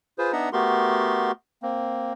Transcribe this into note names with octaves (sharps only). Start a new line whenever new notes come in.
F4 G#4 B4 C5
B3 D4 D#4 E5 F#5 A#5
A3 B3 F#4 G4 A#4 C6
A#3 C4